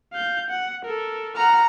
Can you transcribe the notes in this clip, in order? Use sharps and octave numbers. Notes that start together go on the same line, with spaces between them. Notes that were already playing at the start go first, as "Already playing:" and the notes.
F5 G6
F#5
A4 A#4
F#5 A#5 F6